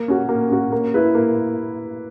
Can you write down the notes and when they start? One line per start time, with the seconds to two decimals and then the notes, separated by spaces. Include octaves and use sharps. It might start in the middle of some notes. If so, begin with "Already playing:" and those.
Already playing: A#3
0.08 C#4 F#4
0.29 A#3
0.50 C#4 F#4
0.72 A#3
0.94 E4 B4
1.15 A#3